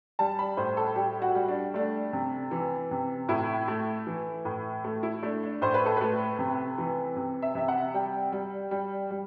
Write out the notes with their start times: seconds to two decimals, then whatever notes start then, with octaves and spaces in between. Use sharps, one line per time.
0.19 G3 A5
0.39 B5
0.57 A2 C5
0.77 A4
0.96 G3 G4
1.22 F#4
1.35 G3
1.48 D4
1.74 A3 D4
2.13 C3
2.51 E3
2.91 C3
3.29 A2 E4
3.68 A3
4.07 E3
4.45 A2
4.84 A3
5.03 E4
5.22 A3 D4
5.43 D4
5.62 A2 C5
5.74 B4
5.86 A4
5.97 A3 B4
6.39 C3
6.78 E3
7.16 C3
7.42 E5
7.55 C3 E5
7.68 F#5
7.94 G3 G5
8.32 G3
8.71 G3
9.11 G3